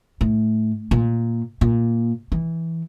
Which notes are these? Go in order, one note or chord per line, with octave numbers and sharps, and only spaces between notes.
A2
A#2
A#2
E3